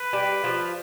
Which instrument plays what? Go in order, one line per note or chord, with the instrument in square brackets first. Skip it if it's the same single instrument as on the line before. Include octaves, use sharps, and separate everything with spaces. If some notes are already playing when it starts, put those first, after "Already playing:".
Already playing: [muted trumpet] B4
[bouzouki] G3 G4
F3 F4